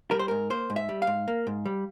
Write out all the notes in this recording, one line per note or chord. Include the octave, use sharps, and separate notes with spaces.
G3 A#4
C5
G#2 A#4
A#3 C5
G#2
E5
G3
F5
G#2
A#3
G#2
G3